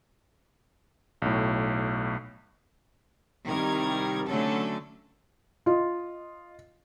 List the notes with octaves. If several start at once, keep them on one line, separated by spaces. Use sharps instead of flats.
B1 A2
C2 D#3 G3 A#4 G#6
D3 F#3 A3 C#4 A4
F4 D#5